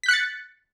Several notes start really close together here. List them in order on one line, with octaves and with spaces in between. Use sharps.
B6 G6 F#6 C#7 A6